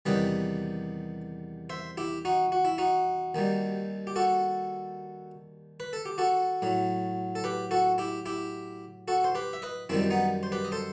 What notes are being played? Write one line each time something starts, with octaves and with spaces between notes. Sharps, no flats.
E2 C3 D#3 G3 B4 D#5
C5 E5
E4 G4
D#4 F#4
F#4
E4
D#4 F#4
D#2 D#3 G3
G4
F#4 A4
B4
A4
G4
F#4 A4
A2 F#3
A4
G4 B4
F#4 A4
E4 G4
E4 G4
F#4 A4
C5
G4 B4
E5
B4 D#5
F#2 D#3 G3 C4 E4
B3 D#4
C5
G4 B4
D#5
A4 C5